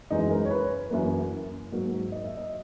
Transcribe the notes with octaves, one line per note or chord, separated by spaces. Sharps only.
F#2 E3 G#3 D#4
A#4
C#5
B4
F#2 E3 A#3
G#2 F#3 A#3
D#5
E5
D#5